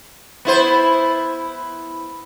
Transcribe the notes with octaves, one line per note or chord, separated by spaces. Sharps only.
B3 E4 C5